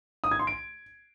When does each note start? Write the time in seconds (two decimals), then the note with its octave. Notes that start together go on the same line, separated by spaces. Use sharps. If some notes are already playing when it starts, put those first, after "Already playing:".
0.24 D#6
0.31 G#6
0.39 C6
0.47 D7